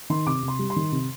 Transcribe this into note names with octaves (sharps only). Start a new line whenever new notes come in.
D#3 C6
C3 D6
C3
C6
G3
C6
D#3
C3